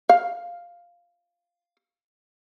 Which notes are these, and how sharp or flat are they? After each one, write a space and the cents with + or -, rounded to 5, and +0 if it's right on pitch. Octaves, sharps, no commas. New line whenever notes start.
F5 +0